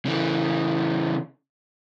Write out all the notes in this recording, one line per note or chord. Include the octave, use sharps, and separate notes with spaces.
C#3 E3